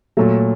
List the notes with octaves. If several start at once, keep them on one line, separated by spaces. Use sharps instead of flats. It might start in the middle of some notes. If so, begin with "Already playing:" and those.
A#2 F#3 A3